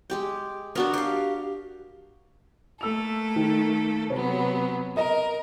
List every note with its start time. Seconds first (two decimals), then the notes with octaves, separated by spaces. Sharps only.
0.10 G#3 G4 G5
0.75 B3 D4 F#4 A#4
0.94 G4 F5
2.81 A3 A#3 A4 E6 F7
3.36 D#3
4.10 C3 F#3 B3 C#5
4.97 A#4 D#5